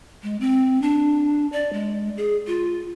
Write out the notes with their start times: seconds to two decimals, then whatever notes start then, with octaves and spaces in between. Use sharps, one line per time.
0.23 G#3
0.40 C4
0.82 D4
1.52 D5
1.73 G#3
2.17 G#4
2.47 F4